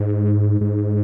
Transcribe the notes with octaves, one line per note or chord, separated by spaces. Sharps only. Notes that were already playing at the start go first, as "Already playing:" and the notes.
Already playing: G#2
G#2